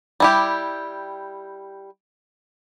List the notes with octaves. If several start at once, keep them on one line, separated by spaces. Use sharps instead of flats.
G3 E4 G4